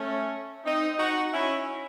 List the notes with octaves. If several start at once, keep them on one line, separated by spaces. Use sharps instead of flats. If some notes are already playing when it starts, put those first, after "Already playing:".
Already playing: A3 C#4
C4 D#4
D#4 F#4
C#4 E4